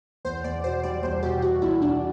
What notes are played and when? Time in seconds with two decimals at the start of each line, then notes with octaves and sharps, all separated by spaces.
0.25 E2 C5
0.44 E2 D5
0.64 B2 C5
0.83 G3 D5
1.03 E2 C5
1.23 B2 G4
1.42 B2 F#4
1.62 E2 E4
1.82 B2 D4